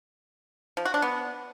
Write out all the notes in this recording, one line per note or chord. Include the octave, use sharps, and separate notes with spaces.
F3
F#4
D4
B3